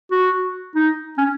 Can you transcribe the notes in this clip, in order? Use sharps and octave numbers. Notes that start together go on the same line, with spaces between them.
F#4
D#4
C#4